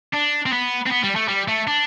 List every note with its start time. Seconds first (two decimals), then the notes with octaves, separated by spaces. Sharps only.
0.14 D4
0.46 C4
0.52 B3
0.86 C4
0.91 B3
1.03 G3
1.16 A3
1.29 G3
1.48 A3
1.68 D4